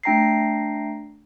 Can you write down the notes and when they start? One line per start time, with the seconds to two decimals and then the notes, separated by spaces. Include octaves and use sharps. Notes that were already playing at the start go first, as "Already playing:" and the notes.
0.04 A3 D4 G5 A#5 A#6 C7